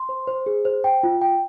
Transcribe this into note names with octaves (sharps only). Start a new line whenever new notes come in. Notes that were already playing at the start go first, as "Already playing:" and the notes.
Already playing: C6
C5
C5
G#4
C5
G5
F4
G5